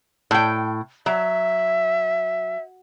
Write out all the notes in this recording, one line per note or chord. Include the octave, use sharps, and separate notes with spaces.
A2 G5
F#3 E5